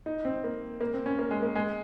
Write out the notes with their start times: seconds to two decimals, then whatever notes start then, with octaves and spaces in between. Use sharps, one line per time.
0.06 D#4
0.25 C4
0.44 A#3
0.81 A#3
0.93 C4
1.06 C#4
1.19 A#3
1.31 G#3
1.43 A#3
1.55 G#3